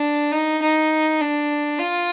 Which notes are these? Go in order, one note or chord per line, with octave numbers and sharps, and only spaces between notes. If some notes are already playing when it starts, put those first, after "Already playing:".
Already playing: D4
D#4
D#4
D4
F4